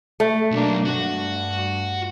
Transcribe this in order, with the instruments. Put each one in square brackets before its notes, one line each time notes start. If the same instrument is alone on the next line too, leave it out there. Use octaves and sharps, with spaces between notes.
[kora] A3
[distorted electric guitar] B1 [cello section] A#3 D4
[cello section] G2 [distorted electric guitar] F#4